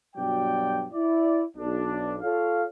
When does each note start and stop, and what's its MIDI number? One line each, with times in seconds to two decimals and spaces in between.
0.16 0.86 43
0.16 0.86 47
0.16 0.86 54
0.16 0.86 74
0.16 0.86 79
0.93 1.42 64
0.93 1.42 74
1.57 2.16 35
1.57 2.16 62
2.22 2.65 65
2.22 2.65 69
2.22 2.65 73
2.22 2.65 77